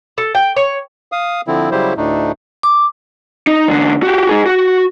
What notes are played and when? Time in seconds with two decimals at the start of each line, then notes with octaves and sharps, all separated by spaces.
0.18 A4
0.35 G5
0.56 C#5
1.12 F5 D#6
1.48 D3 F3 C4 E4
1.71 C#3 F#3 G3 E4 G4 C5
1.97 D2 A2 A3 D4 D#4
2.63 D6
3.47 D#4
3.68 E2 D3
4.03 F#4 G4
4.29 D#4 G#4
4.46 F#4